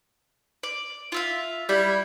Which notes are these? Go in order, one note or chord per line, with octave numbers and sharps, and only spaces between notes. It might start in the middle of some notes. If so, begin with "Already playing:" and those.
D5
F4 E5 F5
G3 E4